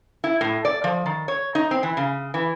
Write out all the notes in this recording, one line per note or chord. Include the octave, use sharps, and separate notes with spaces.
E4
A2
D5
F3
D#3
C#5
D#4
C4
E3
C#3
E3